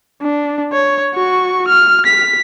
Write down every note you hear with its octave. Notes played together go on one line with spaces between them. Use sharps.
D4
C#5
F#4 C#6
F6
B6